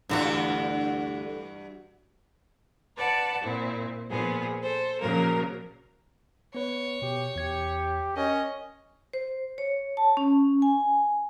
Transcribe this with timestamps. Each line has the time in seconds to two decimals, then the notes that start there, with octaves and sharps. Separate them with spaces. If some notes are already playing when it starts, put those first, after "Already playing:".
0.09 D2 G2 D3 E3 F4 F#4
2.97 B4 D5 F#5 A5
3.42 A#2 C4 E4
4.09 A#2 F3 B3 G#4
4.61 A4 C5
5.01 A#2 C#3 F3 F#3 A#3 A#4
6.55 B3 B4 C#5
7.02 B2 G4
7.36 E2 G4 G#6 C#7
8.17 C#4 A#4 D#5
9.13 C5
9.58 C#5
9.97 A5
10.17 C#4
10.62 G#5